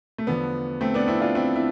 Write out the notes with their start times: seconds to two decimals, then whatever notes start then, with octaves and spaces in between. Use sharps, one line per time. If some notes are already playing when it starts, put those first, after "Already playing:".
0.18 A3
0.27 E2 D3 F3 B3
0.81 A3 C4
0.94 B3 D4
1.08 C4 E4
1.21 D4 F4
1.35 C4 E4
1.56 E4